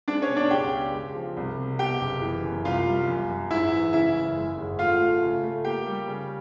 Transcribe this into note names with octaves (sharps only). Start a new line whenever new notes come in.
G#3 D4 D5
C#4 C#5
B2
D4 D5
C#2 G4 G5
C#2
C#2
F3
C2
C3
B2 G4 G5
F#1
E3
F#2
C2 F4 F5
G3
F#2
F#2
G#2 E4 E5
E3
C#3 E4 E5
F#1
G#3
G#1
A3 F4 F5
A3
C#3
A3
A#3 G4 G5
G3
C#3